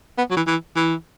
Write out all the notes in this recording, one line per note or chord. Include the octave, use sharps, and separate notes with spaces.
B3
F#3
E3
E3
E3